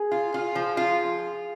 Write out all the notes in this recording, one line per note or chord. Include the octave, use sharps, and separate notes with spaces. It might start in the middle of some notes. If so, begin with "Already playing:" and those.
Already playing: G#4
F4
F4
F3
F4